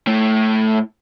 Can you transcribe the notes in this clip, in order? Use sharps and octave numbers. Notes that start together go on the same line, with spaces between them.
A2 A3